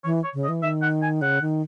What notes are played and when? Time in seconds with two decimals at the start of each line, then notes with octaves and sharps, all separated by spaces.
0.04 E3 C#5
0.24 C#5
0.34 C#3
0.44 D#5
0.48 E3
0.63 D#3 E5
0.82 F#5
1.02 G#5
1.22 C#3 F#5
1.41 D#3